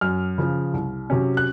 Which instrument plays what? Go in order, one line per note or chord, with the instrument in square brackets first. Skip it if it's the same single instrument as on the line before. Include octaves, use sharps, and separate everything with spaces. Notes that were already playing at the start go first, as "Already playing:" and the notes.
[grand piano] F#2 F6
C#3 F3
C2
C3 F#3 C#4
F#6